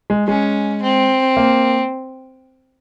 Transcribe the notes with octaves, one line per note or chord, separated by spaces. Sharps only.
G#3
G#3 C#4
C4
A#3